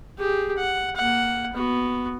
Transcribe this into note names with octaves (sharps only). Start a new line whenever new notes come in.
G4 G#4
F#5
A#3 F#5
B3 F#4